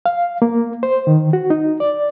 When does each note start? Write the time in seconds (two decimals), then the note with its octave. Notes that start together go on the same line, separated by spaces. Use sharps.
0.06 F5
0.42 A#3
0.83 C5
1.07 D#3
1.33 F#4
1.50 D#4
1.80 D5